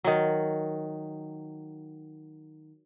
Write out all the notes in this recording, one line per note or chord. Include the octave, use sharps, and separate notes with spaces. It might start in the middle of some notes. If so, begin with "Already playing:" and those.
D#3 F#3